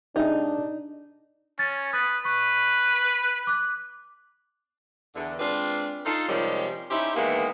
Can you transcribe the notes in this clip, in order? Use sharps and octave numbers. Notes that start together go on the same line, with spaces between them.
C3 G#3 D4 D#4
C#4 A6
B4 D#6 A6
B4 C#6
D6 F#6
E2 D3
G#3 C4 D4 F4 B4 D5
D#4 F4 A4
C3 D#3 F3 G3 G#3 C#4
C#4 D#4 E4 G4 C5
D#3 E3 G#3 A#3 B3